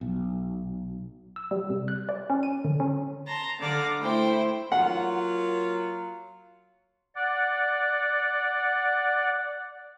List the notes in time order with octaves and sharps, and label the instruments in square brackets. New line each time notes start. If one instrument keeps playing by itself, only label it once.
[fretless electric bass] B1
[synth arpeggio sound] E6
G3
C3
F#6
D5
C#4
D#7
D3
C#4
[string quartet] A5 A#5 C6
D3 D5 F5 A#5 D6
A3 E4 C5 G5
[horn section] F#3 A#3 F4 [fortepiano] F#5
[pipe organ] D5 F#5